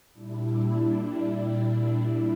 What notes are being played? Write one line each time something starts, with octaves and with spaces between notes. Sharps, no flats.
A#2 G3 D4 E4